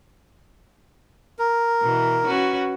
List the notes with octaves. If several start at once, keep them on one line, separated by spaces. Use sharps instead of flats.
A#4
B2 E3
C#4 F#4 B4